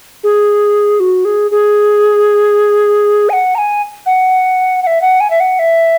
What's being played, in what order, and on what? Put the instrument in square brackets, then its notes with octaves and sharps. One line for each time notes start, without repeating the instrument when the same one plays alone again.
[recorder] G#4
F#4
G#4
G#4
G#5
F#5
A#5
G#5
F#5
F#5
E5
F#5
G#5
E5
F#5
E5